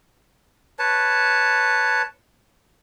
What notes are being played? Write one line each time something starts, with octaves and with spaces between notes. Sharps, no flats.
B4 C#5 A5